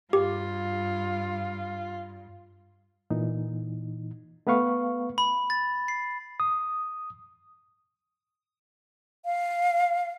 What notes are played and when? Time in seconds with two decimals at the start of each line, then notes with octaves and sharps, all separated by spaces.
0.13 G2 F4 G4
3.10 A#2 E3 D#4
4.47 A3 B3 B4 F5 C#6
5.18 B5
5.50 A6
5.88 C7
6.40 D#6
9.25 F5